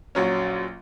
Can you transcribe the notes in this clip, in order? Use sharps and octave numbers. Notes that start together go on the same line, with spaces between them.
A#1 F#3 C#4